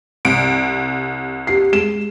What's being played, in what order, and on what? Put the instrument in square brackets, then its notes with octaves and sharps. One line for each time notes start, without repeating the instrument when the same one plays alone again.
[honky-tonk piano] C2 D7
[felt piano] G4 C7
G#3 E7